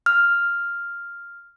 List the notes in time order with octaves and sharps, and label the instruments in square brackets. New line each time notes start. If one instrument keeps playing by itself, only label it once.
[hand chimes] F6